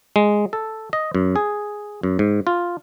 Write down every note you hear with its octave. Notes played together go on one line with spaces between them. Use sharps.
G#3
A4
D#5
F#2
G#4
F#2
G#2
F4